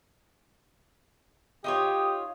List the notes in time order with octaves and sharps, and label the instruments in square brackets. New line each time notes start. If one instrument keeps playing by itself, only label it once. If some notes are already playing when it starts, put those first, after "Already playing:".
[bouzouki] D#4 F4 C#5 [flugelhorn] G4 [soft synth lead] D#6